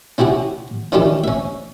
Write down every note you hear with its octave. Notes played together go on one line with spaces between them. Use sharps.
C#4 E4 G4 G#4 F#5
D#3 C#4 D4 E4 G4 A4
C#4 E5